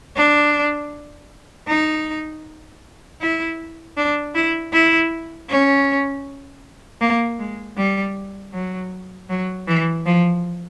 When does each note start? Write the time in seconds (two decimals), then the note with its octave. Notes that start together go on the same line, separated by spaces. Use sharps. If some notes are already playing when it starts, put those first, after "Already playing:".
0.16 D4
1.68 D#4
3.21 E4
3.97 D4
4.35 E4
4.73 E4
5.49 C#4
7.01 A#3
7.39 G#3
7.77 G3
8.53 F#3
9.29 F#3
9.67 E3
10.06 F3